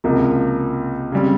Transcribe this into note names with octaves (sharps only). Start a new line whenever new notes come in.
C#2 C3 F3 A#3
C#3 G3 C4